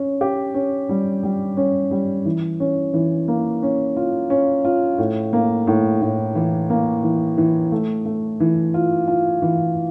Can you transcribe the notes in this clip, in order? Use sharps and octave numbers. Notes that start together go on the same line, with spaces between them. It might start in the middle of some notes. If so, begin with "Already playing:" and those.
Already playing: C#4
G4
C#4
G3
G3
C#4
G3
E3
C#4
E3
A#3
C#4
F4
C#4
F4
A2
A#3
A2
A2
E3
A#3
E3
E3
A3
A3
E3
F4
F4
E3